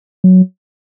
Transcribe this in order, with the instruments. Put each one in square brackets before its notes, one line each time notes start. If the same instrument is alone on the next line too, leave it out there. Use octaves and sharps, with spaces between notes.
[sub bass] F#3